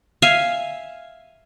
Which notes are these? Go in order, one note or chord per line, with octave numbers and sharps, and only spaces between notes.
E5 F5 G#5